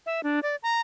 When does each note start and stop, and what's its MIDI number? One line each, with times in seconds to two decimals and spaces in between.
0.06 0.21 76
0.23 0.40 62
0.43 0.56 74
0.63 0.81 82